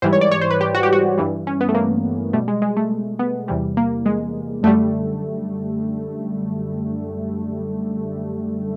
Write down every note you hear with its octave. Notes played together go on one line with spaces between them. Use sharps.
G#2 E3 G3 C5
C#5
D5
C#5
C5
B4
G4
F#4
G4
F#4
G2 E3 G3
C#4
B3
A3
A#3
B2 G3 A3
G#3
G#3
A3
B3
E2 C3 E3 G3
A#3
G#3
F#2 D3 G3 A3